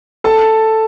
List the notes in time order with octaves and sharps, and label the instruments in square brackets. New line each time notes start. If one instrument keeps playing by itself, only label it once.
[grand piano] A4 A5